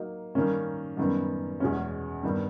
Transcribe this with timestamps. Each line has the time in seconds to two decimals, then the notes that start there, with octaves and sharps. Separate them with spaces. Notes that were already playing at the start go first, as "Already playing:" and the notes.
Already playing: F#3 A#3 D#4
0.35 D#3 G3 A#3 C#4
0.97 F#2 D#3 G3 B3
1.60 E2 B2 G#3 C#4
2.23 G2 D#3 G3 B3